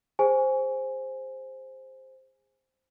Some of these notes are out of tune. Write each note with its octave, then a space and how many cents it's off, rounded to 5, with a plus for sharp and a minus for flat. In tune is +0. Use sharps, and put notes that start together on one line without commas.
G#4 -30 C5 +0 G#5 +0